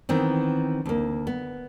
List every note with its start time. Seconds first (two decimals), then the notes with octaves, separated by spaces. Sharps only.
0.09 D#3 E3 B3 C4
0.86 D2 A#3
1.27 B3